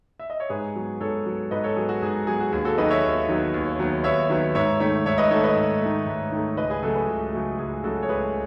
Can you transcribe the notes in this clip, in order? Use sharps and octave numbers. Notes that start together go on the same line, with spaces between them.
E5
D#5
C#5
G#2 G#4 B4
F#3 B3
G#2 A4 C#5
F#3 B3
G#2 B4 D#5
A4 C#5
F#3 B3 G#4
F#4
G#2 G#4
F#3 B3 G#4
F#4
D#2 G#4
F#4 A4
D#3 F#3 B3 B4 D#5
C#5 E5
D#2
D#3 F#3 B3
D#2
D#3 F#3 B3
D#2 C#5 E5
D#3 F#3 B3
G#2 C#5 E5
D#3 A3 C#5 E5
G#2 C#5 E5
B4 D#5
D#3 A3 A4 C#5
B4 D#5
G#2
D#3 A3
G#2
D#3 A3
C#2 B4 D#5
G#4 B4
C#3 F#3 A3 F#4 A4
G#4 B4
C#2
C#3 F#3 A3
C#2 G#4
C#3 F#3 A3 F#4 A4
C#5
C#2 G#4 B4